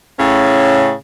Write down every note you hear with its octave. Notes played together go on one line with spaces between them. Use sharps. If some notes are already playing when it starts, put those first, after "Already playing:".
A2 C#3 C#4